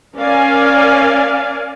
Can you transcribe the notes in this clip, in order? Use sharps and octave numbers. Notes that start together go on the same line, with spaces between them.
C#4 A#4 D5 F5 G#5